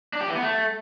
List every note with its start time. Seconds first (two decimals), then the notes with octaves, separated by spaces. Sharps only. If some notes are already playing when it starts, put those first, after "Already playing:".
0.13 D4
0.21 G4
0.28 E3
0.36 B3
0.43 A3